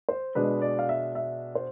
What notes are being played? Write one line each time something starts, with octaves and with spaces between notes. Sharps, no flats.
C5
B2 G#3 D4 B4
D5
F5
E5
E5
C5